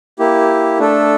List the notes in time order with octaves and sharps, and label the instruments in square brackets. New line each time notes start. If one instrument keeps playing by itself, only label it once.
[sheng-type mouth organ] A#3 E4 G4
A3 D4 A4